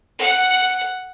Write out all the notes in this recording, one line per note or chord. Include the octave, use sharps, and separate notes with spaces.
F#5